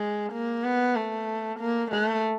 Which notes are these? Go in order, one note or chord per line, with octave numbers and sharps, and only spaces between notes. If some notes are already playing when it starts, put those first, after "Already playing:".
Already playing: G#3
A#3
B3
A3
A#3
A3